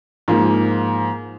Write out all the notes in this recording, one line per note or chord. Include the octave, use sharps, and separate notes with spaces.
G#2 F3 A#3